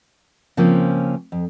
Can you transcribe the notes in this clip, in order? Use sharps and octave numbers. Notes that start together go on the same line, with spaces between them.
C#3 F3 A#3 C4 C#4
F2